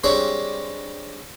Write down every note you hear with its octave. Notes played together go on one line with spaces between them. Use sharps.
G3 G#3 C4 D4 C#5 E5